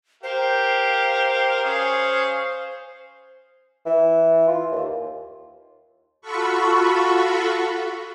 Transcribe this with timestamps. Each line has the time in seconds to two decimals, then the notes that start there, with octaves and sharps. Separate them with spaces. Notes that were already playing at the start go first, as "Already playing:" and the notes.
0.23 G4 A#4 C5 F5
1.64 C#4 G#4 F5
3.86 E3
4.48 F4
4.71 D#2
6.21 F4 F#4 A4 B5 C#6